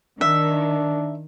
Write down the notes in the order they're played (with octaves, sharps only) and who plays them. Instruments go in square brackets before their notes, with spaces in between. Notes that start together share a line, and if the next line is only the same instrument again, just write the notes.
[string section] D#3 [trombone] D4 [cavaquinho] E5